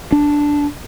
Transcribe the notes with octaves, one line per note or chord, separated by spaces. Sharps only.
D4